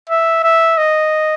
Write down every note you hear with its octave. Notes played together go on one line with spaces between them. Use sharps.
E5
E5
D#5